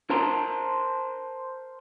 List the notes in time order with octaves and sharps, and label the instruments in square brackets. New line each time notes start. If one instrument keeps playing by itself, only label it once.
[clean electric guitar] A#4 C5 A5 A#5 C6